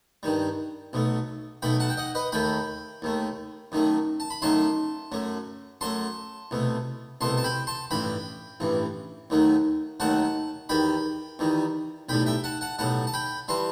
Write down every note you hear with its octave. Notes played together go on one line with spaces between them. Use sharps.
G2 D#3 G3
B1 B2 A3
B1 B2 A3 G5 B5
F#5 A5
G5
D#5 F#5
B4 D#5
D#2 D#3 A3 G5 B5
D#2 D#3 A3
F#2 D#3 F#3 A3
A5
B5
F#2 D#3 F#3 A3 A5 C6
F#2 F#3 A3
F#2 F#3 A3 A5 C6
C2 B2 A3
C2 B2 A3 A5 C6
A5
G5 B5
A5 C6
A1 G2 E3 G5 B5
A1 G2 E3
D#2 D#3 F#3 A3
D#2 D#3 F#3 A3 F#5 A5
E2 D#3 G3 G5 B5
E2 D#3 G3
B1 A2 G3 G5 B5
E5 G5
F#5 A5
F#5 A5
B1 A2 G3 F#5 A5
A5
G5 B5
E3 G3 A5 C6